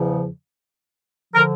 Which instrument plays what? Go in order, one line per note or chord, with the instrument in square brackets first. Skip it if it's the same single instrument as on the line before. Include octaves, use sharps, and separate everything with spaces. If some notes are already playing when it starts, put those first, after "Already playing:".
Already playing: [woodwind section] E2 C#3 F3
D3 F3 A#4